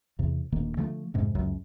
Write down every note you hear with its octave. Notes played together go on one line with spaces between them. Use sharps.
E2 C3
D#1 D2 D#3 A#3
D3 F3 G#3 A3
F2 G#2 C3
C#2 F#2